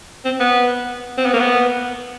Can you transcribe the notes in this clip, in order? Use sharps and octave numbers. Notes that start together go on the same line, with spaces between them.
C4
B3
C4
B3
A#3
B3